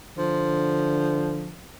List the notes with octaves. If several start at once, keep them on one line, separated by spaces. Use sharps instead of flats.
D3 F3